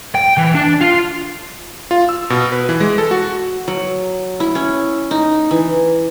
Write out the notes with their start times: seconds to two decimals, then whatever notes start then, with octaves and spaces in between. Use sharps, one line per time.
0.15 G5
0.37 E3
0.55 D4
0.81 F4
1.91 F4
2.09 E6
2.30 B2
2.52 B4
2.69 E3
2.80 G#3
2.98 A4
3.11 F#4
3.68 F#3
4.40 E4
4.55 C#4
5.11 D#4
5.51 E3